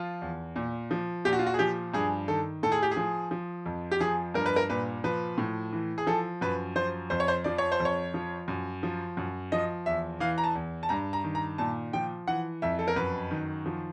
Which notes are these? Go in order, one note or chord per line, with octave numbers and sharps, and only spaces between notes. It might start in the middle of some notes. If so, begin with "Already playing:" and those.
Already playing: F3 F4
E2
A#2
F3
A#2 G4
F#4
F4
F#4
G#4
F3 G4
G2 G#4
D#3 A4
A2 A4
G#4
G4
F3 G#4
F3
F2
G4
F3 G#4
G2 A#4
B4
A#4
A#2 B4
F3 B4
A2
E3
G#4
F3 A4
F#2 B4
F3 C5
F2 C5
C#5
C5
F3 D5
C#5
C5
F2
C#5
F3
F#2
F3
F#2
F3 D#5
E2 E5
E3 F5
A#5
A5
E2
A5
G2 A#5
A#5
D#3
A#5
A#2 A5
F3 G5
E3 F#5
F2 E5
A4
A#4
F#2 B4
D#3
F3